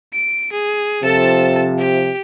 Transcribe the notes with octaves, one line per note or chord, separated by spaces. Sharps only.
D7
G#4
C3 F3 A4 A5
G4